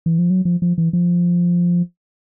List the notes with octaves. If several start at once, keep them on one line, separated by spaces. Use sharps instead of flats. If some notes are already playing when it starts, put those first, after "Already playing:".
E3
F3
F#3
F3
F3
E3
F3